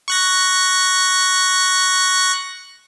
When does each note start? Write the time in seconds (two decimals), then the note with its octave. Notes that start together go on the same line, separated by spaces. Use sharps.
0.08 C#6 F#6 A#6